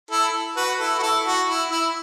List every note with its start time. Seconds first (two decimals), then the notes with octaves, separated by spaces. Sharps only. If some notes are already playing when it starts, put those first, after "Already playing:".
0.11 E4 A4
0.57 F#4 B4
0.79 E4 A4
0.98 F#4
1.02 E4 A4
1.25 F#4
1.48 E4
1.71 E4